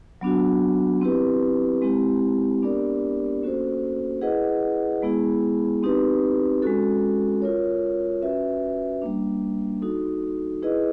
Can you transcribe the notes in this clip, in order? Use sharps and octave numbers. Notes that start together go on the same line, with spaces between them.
F#3 B3 D4 F#4
C4 E4 G4 B4
G#3 C4 E4 G4
B3 D4 G4 A#4 D5
A#3 C#4 F#4 A4 C5
E4 G#4 B4 D#5 F#5
G#3 B3 E4 G#4
C4 D#4 G4 B4
G#3 C#4 F#4 A4
F4 A#4 C#5
C#4 F#4 B4 E5
G3 A#3 D4
D#4 F#4 A4
E4 G#4 B4 D#5